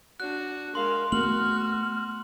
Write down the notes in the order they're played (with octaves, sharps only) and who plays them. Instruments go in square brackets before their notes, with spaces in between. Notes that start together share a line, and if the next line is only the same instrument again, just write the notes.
[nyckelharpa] D4 F#4 [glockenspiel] F#6
[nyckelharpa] G#3 F5 [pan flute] A#4 [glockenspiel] C6
[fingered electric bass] A3 B3 [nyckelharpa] F#4 [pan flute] F6 [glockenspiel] F#7